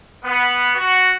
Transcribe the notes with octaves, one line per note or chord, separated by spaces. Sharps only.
B3
F#4